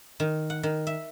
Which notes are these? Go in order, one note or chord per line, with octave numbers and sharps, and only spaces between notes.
D#3
F#5
D#3
E5